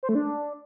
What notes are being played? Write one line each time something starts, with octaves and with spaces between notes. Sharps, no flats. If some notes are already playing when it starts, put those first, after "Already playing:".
C5
A3
D4